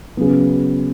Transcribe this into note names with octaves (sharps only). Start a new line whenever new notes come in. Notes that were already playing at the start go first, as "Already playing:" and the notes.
C#3 F#3 B3